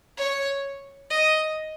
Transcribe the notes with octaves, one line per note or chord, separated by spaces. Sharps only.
C#5
D#5